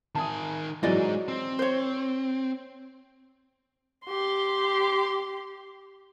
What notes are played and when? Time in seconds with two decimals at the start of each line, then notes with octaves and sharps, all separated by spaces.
0.15 D#3 G#5 A5 D#6
0.83 E3 F#3 G#3 D#4 D5 D#5
1.28 C4
1.59 C5 C#5
4.06 G4 C6